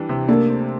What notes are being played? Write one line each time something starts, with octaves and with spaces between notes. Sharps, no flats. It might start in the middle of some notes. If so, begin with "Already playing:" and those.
Already playing: E3 G3 D4
C3
A3 A#3 D4
C4